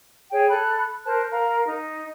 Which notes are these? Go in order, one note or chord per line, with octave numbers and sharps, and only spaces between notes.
G#4 C#5 G5
A4 B5 F#6
A#4 C5 A5 F#6
A#4 F5 A#5
D#4